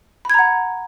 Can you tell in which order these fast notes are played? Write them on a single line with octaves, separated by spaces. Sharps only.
B5 G#6 A#5 F#5